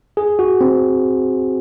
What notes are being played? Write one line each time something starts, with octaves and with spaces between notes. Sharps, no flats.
G#4
F#4
C4